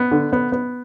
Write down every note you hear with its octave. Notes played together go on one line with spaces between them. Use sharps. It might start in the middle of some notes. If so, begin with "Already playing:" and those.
Already playing: B3
D3
B3
B3